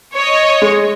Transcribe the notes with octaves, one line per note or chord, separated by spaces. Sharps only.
C#5 D#5
G#3